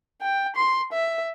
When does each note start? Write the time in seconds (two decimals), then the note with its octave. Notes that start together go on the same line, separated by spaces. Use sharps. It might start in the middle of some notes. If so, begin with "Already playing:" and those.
0.22 G5
0.56 C6
0.93 E5